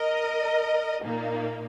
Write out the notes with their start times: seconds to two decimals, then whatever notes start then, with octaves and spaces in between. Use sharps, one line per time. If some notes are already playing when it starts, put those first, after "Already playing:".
Already playing: A#4 D#5
1.03 A#2 A#3 D#4